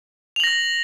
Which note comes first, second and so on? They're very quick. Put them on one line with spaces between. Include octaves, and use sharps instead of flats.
F7 F#7 A#6